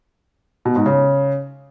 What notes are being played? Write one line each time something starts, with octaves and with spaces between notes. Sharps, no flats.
B2
G#2
C#3